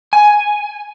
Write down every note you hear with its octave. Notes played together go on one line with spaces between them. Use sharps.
G#5